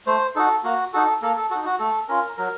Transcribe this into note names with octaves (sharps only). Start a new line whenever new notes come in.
A3 C5
D#4 F#4 A4
A#3 F#4
D#4 F#4 A4
A#3 A4
A4
D#4 F#4 A4
F#4
A3 A4
C#4 F4 A#4
F#3 A#4